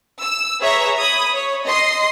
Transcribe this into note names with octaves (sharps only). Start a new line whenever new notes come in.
E6
G#4 B4 C#5 E5 A#5
B5 D#6 G#6
C#5
D#5 C6 C7